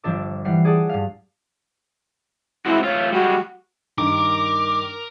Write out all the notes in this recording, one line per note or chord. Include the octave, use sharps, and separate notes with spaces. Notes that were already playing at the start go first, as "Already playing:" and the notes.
G1 F3 D4 A4 D6
E3 G3 F#5 C7
G#4 D5 F#5 A5 D#6
G2 F5
G#3 C4 E4 F#4
A3 F4 C#5
G3 G#3 F#4
G2 D#3 A#4 D6